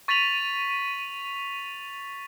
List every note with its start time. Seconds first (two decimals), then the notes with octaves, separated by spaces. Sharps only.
0.08 C#6 A6 B6 D#7 F7 F#7